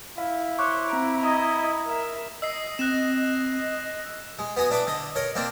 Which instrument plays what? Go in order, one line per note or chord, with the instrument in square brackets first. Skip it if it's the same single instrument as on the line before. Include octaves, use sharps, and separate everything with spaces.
[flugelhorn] E4 [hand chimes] F5
[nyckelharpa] C5 C#5 [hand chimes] C#6 D6 F#6
[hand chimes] C4 D7 [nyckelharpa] A#5
[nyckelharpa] D#5 [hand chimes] A#5 D#6 G#6
[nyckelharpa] A#4 E5
[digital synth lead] D#5 [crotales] E6 C7
[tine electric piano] C4 [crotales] F#6 A#6 E7
[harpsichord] G#3
B3 F#4 G#5 D#6
D4 E4 B4 D6
D3 D#5
A#4 C#5 D#5
A#3 C4 D4